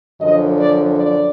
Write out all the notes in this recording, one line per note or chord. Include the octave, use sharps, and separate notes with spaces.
F#2 D3 F3 D#5
D5
D5